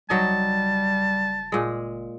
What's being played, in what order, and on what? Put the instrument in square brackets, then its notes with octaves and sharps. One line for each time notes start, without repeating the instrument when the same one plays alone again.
[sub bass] F#1 [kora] F#3 D#4 [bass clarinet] G3 [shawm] A5
[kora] A#2 G#3